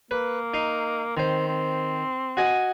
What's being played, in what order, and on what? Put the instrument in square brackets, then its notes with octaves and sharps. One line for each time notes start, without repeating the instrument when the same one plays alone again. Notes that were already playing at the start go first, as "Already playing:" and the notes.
[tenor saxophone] A#3 [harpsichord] B4
[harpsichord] D#4 C6
[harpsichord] D#3 C5 [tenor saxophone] C4
[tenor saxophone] C4
[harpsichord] F#4 D#5 G#5